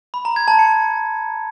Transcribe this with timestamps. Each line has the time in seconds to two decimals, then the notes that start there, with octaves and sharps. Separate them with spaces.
0.14 B5
0.25 A#5
0.36 G#6
0.48 A5
0.59 C#7